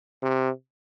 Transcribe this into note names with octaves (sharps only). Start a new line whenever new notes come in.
C3